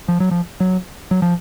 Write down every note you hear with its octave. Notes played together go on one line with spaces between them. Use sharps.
F3
F#3
F3
F#3
F#3
F3